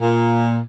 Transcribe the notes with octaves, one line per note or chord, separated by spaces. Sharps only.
A#2